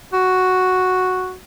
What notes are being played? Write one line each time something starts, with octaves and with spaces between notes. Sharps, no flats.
F#4